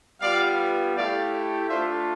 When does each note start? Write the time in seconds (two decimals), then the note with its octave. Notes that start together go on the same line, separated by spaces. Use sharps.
0.20 G3 B3 F4 D5 F5
0.95 A3 E4 G4 D5 F5
1.69 A3 D4 F4 C5 E5